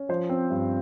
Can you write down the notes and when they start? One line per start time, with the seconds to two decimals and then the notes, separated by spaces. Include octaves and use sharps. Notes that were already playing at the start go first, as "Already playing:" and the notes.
Already playing: C#4
0.09 F3 C5
0.29 C4
0.51 G2